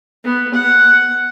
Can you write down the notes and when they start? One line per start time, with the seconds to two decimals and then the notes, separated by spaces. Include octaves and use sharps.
0.24 B3
0.54 F#5